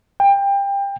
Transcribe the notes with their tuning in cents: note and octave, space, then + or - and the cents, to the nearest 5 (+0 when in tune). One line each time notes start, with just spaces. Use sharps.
G5 +25